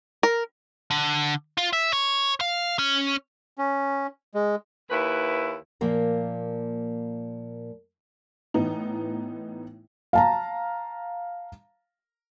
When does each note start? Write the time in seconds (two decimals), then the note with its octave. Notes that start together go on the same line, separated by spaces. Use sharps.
0.23 A#4
0.91 D3
1.57 F4
1.73 E5
1.93 C#5
2.41 F5
2.79 C#4
3.58 C#4
4.34 G#3
4.90 D#2 E4 B4
5.81 A#2 F3 A#3 A#4
8.54 A2 E3 B3 D#4
10.13 F5 A5 A#5